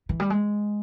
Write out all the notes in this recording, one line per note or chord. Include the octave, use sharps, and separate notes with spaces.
E3
G3
G#3